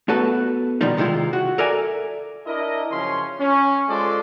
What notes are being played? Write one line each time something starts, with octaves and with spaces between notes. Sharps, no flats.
A3 B3 F#4 A4 B4 A5
F2 B2 D#3 F3 G3 D#4
C3 D#3 G#3 E4 F4
F#4
A4 A#4 D5 E5 G#5
D4 E4 A#4 D#5
F#2 C#3 F3 C#4 C6
C#4
G#3 F4 A4 C5 D5